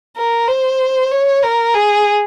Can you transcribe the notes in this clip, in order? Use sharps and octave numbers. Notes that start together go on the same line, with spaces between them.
A#4
C5
C#5
A#4
G#4